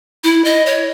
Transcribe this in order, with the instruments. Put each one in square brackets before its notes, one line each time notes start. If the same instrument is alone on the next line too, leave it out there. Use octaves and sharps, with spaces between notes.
[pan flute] E4
D#5
C#5